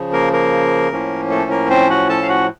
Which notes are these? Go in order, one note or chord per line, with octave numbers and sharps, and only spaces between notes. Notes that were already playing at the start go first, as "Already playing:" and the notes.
Already playing: C#3 F3
A#3 A#4
A#3 A#4
A2 F3 A#3 C#4
A3 A4
A#3 A#4
C4 C5
F#4 F#5
A4 A5
F5
F#4 F#5